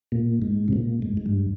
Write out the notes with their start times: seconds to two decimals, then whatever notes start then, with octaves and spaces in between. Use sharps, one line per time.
0.12 A#2
0.42 G#2
0.68 C3
0.73 A#2
1.02 G#2
1.17 G#2
1.26 G2